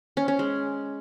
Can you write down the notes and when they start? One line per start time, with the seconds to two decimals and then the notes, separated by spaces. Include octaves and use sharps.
0.17 C#4
0.28 C#4
0.39 G#3